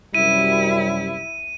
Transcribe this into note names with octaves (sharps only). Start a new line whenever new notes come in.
F#2 C3 G3 E4 D#7